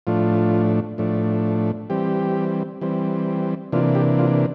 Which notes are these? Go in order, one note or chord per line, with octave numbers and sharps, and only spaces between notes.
A2 F3 A3 D4 F4
A2 F3 A3 D4
E3 G3 C4 G4
E3 G3 C4
C3 E3 A#3 D4 F4
G4
F4